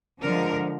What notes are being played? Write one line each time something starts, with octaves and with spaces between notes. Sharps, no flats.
D3 F3 G#3 A#4